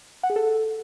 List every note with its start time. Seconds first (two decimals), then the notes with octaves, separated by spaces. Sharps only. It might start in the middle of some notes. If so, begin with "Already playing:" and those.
0.23 F#5
0.30 G#4
0.36 A4